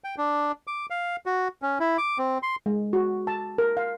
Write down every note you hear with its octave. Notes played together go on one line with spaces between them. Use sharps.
G5
D4
D6
F5
F#4
C#4
E4
D6
C4
C6
G#3
F#4
A5
A#4
F5